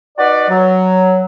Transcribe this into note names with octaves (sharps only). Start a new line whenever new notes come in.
D#4 F#4 B4 D5
F#3